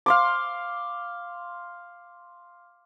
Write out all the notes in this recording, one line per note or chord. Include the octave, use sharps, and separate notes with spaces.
F5 C6 D6